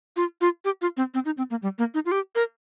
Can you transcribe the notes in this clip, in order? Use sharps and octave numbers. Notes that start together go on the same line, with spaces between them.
F4
F4
G4
F4
C4
C4
D#4
C4
A#3
G3
A#3
D#4
F4
G4
A#4